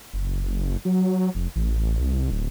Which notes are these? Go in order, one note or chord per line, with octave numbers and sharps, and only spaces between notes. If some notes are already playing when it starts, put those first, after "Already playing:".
F#1
F#3
F1
A1
C2
D1